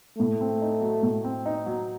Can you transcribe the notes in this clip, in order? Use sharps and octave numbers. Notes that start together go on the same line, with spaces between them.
A2 A3
C4
D#4
F#3
A2
C4
D#4
F#3